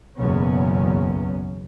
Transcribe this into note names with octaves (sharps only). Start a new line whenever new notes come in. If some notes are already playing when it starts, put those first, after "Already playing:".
F#1 B1 E2 F#3 B3 C#4